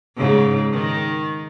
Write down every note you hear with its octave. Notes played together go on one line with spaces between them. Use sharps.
G#2 C#3
D#3